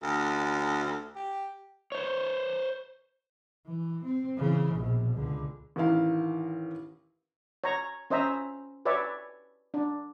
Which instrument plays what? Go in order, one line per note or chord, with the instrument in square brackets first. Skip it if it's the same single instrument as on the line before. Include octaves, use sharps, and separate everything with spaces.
[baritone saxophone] D2
G4
[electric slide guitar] C5 C#5
[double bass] E3
C4
C#3 E3
A#1 B2
C#2 D3
[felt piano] A1 D#3 E4 F5
[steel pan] C#5 A#5
C#4 C5 D#5 E5 A#5
B4 C#5 D5 E5
D4